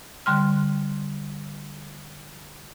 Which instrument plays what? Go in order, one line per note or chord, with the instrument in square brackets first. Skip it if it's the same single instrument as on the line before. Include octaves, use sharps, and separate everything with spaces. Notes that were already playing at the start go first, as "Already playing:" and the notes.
[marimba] D3 G3 C6 F6